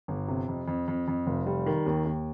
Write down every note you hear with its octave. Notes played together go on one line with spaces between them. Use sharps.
G1
C3
F2
F2
F2
F2
F1
G3
D#3
D#2
D#2